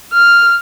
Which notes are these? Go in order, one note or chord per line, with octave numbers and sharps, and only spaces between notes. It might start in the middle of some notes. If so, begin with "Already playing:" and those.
F6